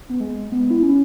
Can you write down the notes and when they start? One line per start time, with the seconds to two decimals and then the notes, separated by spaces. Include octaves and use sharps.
0.09 B3
0.20 G#3
0.52 B3
0.70 E4
0.83 C#4